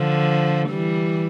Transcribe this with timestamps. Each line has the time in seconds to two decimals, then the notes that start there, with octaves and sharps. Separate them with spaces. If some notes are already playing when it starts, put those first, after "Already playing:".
Already playing: D3 F3
0.70 E3 G3